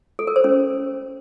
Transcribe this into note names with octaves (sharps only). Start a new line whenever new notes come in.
A4
A#4
C5
C#4